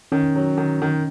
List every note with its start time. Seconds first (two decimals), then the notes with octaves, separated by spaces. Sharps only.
0.12 D#3 C#4
0.35 F#3
0.58 D#3
0.82 D#3